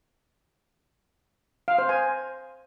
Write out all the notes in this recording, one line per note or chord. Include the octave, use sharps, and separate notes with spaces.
F5
C5
G#5